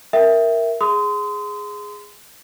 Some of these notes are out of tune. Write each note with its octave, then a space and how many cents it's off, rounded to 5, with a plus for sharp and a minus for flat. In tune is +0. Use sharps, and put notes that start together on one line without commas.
A#4 +0 E5 +0 G5 -15
G#4 +0 C6 -30 D#6 +15